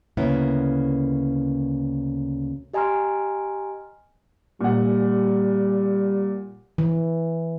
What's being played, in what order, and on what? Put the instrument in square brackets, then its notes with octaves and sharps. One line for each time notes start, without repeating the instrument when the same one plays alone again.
[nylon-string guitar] D2 C#3 A#3 B3 C#4 E4
[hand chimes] G4 D#5 G#5 A#5 C6 F6
[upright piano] A#2 F#5 [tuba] G3
[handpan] E3